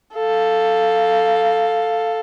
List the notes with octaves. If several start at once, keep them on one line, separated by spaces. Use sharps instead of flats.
A4 F5